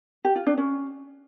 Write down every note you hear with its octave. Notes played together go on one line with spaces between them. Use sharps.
G4
F4
D4
C#4